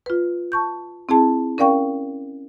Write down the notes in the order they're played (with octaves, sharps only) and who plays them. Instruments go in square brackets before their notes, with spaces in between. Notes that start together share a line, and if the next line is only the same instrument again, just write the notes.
[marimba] F4 B4
A5 C#6 G6
C4 E4 G#4 A5
C#4 A#4 D5 F5 G5 C#6